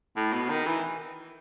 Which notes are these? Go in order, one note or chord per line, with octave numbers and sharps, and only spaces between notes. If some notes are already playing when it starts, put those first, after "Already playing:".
A2
B2
D#3
E3